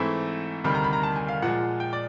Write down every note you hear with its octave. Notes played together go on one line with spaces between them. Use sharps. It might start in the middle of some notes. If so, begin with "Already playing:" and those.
Already playing: G#2 E3 A3 C4 E4
D2 C3 D#3 G3 B5
A#5
B5
A#5
A5
G#5
F5
A#2 F3 G#3 F#5
G5
D5